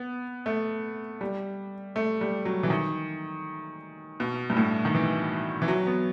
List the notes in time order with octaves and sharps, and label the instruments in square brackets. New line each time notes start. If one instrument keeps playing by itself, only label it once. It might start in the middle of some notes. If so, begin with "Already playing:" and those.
Already playing: [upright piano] B3
A3
G3
A3
G3
F#3
E3
D#3
B2
G2
A2
D#3
E3
E3
F#3
B3